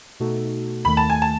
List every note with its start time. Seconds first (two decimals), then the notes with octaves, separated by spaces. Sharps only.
0.20 B2 A3 D#4 F#4 A4
0.85 D#2 D#3 A3 B5
0.97 A5
1.10 G#5
1.22 A5